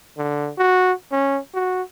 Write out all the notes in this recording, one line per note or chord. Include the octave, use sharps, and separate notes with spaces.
D3
F#4
C#4
F#4